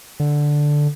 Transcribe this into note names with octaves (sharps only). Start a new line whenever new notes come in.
D3